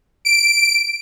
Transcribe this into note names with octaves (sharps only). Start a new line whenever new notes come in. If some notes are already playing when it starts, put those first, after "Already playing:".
D7